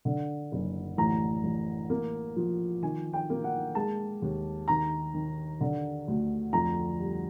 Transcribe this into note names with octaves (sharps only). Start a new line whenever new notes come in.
D3
F#1
A1 A#5
A1
A#3
F3
D#3 G#5
G5
A#3
F#5
G#3 A5
D#2
D#3 A#5
D#3
D3
D2
F2 A#5
G3